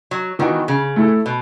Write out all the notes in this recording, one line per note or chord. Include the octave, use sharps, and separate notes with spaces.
F#3
D#3 E3 B3 D#4 F#4
C#3
A3 E4 A4
B2